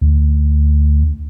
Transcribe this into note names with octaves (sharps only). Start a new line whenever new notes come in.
D2